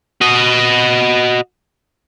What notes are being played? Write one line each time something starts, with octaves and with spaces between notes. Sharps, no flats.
F#4 D#5